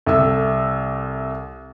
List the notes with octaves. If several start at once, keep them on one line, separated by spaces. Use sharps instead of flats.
C2 A4 E5 E6